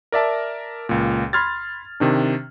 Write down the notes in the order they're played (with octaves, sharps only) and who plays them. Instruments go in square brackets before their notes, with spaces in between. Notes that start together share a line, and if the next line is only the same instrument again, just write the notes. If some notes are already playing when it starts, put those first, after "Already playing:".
[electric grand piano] A#4 D5 E5 A5
C#2 A#2
B5 C6 F6 G#6 A6
C3 D#3 D4